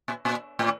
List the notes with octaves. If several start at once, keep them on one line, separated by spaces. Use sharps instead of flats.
A#2
A#2
A2